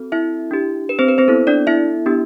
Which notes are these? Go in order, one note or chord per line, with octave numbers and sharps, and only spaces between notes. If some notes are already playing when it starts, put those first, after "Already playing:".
Already playing: C4 F#4 A4
E4 E5
D4 G4
B4
C4 C5
B4
C4 C5
B3 E4 A4
D4 D5
E4 E5
B3 D4 G4